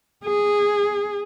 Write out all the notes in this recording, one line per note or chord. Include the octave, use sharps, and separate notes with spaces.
G#4